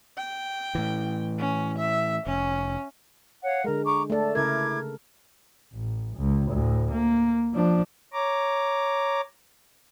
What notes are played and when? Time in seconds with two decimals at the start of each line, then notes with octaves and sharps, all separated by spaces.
0.18 G5
0.75 A2 E3
1.40 C#4
1.78 E5
2.27 F1 C#4
3.44 C#5 F5 F#5
3.64 D3 G#3 A#4
3.85 A#5 C#6 D6
4.10 A3 A4 D5
4.35 C#3 E4 A#4 D6 G#6
5.74 A1
6.17 C#2
6.51 D2 A2
6.90 A#3
7.54 F3 D4
8.13 C#5 A#5 D6